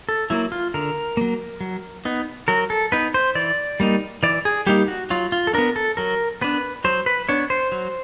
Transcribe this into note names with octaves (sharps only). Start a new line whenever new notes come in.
A4
F#3 A#3 E4
F4
D3 A#4
F#3 A#3
F#3
B3 D#4
F#3 A#4
A4
B3 D#4 B4
C5
E3 D5
G3 A#3 D#4
E3 D5
G#4
G3 A#3 D#4 G4
F#4
F#3 F4
F4
A4
B3 D4 A#4
A4
F#3 A#4
B3 D4 B4
F#3 C5
B4
B3 D4 C#5
C5
F#3